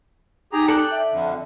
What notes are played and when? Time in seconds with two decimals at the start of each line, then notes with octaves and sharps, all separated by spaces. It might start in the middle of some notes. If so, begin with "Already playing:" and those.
0.53 D#4 G4 G#4 A#5
0.68 A4 D5 G5 F#6
0.91 E5
1.12 F2 D3